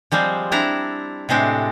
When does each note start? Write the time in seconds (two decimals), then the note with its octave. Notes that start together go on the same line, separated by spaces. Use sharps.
0.12 F3 G3 G#3 C4
0.52 C4 D4 E4 A#5
1.29 A2 C3 G#3 C4 D4